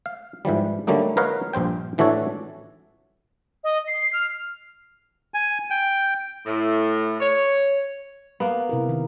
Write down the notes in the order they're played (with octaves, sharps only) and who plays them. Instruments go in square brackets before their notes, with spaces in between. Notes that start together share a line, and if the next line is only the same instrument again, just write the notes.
[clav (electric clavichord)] F5
G#2 E3 F3 G3
D3 F#3 G3 A3 A#3 D#4
A#4 B4 C#5 D#5 F5 F#5
A#1 G2 C5 G5
A2 E3 D4 F#4 A4 C#5
[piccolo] D#5
C7
F6
[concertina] G#5
G5
[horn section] A2
C#5
[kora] A#3 B3
[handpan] C3 E4 A#4
D#3